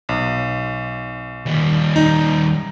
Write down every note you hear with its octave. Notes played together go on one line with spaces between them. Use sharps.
B1
D#2 G3
D#4